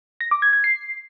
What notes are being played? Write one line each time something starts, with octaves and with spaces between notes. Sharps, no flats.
A#6
D6
G#6
G#6
C7